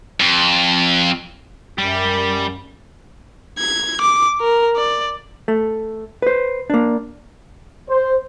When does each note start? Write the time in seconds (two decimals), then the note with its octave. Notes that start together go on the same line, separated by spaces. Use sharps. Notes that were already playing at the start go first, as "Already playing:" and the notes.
0.20 F2
1.78 F#2 G3
3.59 G#6
4.01 D6
4.41 A#4
4.77 D5
5.48 A3
6.22 B4 C5
6.70 A#3 D4
7.90 C5